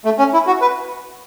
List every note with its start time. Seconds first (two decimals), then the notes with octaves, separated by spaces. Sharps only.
0.05 A3
0.19 C#4
0.34 E4
0.47 F#4
0.62 B4